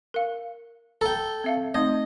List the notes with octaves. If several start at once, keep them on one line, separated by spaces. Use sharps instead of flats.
A#4 F5
A4 G5 A#5
C4 E5 F5
A3 C4 D#4 D#5